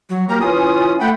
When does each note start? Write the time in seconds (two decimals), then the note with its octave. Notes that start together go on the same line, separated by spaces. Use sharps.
0.09 F#3
0.29 A#3 G4 A#4 A#5
0.40 E3 C#4 F4 D#6
1.00 A3 F#5 G5 B5